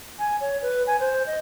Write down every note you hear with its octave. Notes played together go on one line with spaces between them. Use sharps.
G#5
C#5
B4
G#5
C5
D#5